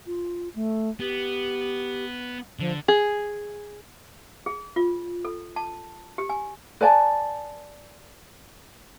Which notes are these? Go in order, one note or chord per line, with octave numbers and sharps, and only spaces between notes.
F4
A3
B3 G4
D3 F3
G#4
G#4
F4
A4
A5
G4
G#5
B4 D5 G#5 A5